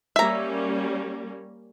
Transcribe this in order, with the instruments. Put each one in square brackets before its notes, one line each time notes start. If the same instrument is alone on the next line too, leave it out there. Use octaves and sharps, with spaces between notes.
[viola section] G3 A#3 C#4 [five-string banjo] E5 A#5